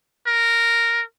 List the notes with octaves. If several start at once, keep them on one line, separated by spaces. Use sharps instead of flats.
A#4